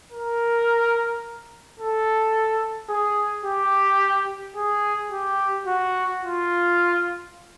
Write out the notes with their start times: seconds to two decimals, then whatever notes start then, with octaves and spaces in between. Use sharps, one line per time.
0.12 A#4
1.80 A4
2.90 G#4
3.45 G4
4.56 G#4
5.12 G4
5.67 F#4
6.23 F4